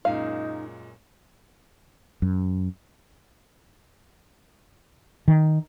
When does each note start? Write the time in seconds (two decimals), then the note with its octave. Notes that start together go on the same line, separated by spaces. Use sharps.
0.05 F#2 A#2 G#3 D#4 F5
2.22 F#2
5.28 D#3